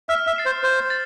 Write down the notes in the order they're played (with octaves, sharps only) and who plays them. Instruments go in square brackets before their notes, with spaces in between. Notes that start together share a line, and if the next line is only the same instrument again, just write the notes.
[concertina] E5 [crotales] F6
[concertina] E5
[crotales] A6 C7 E7
[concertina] C5
[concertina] C5 [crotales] F6
[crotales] A6